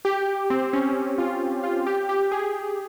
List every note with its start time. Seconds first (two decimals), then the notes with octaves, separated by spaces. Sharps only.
0.05 G4
0.50 C4
0.73 C#4
1.18 F4
1.64 F4
1.87 G4
2.09 G4
2.32 G#4